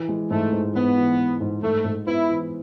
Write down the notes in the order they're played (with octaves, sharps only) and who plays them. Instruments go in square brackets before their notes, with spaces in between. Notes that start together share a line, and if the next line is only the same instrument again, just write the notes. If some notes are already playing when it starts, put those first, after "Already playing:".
Already playing: [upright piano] E3
G#3
[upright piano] G#2 [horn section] A3
[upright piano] G#2
[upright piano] G#2 [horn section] B3
[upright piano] E3
E3
G#2
[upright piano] G#2 [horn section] A3
[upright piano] G#2
[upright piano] B3 [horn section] E4
[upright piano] E3